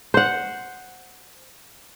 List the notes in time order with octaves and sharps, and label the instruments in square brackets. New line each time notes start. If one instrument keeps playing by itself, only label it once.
[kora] C5 F#5